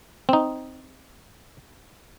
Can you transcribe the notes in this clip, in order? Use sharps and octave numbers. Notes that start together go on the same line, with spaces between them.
C4 D#4